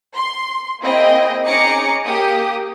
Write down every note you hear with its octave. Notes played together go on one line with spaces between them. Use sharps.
C6
A#3 C4 E4 G#4 D#5 G5
C#4 D#4 G#4 A#5 D6 C#7
A#3 G4 D#6